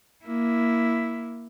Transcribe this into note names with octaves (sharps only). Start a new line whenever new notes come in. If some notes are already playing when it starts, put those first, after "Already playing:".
A#3 E4